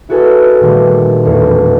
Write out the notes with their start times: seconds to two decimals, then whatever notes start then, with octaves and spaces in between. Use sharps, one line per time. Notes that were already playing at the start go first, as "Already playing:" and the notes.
0.09 E4 F#4 G#4 A4 B4 G#5
0.60 A#2 D#3 G3 A3
1.25 E1 E2 A2 A3